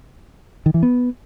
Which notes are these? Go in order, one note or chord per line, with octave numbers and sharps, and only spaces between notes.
D#3
E3
B3